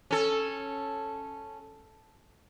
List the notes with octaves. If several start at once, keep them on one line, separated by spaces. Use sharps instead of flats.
C#4 A4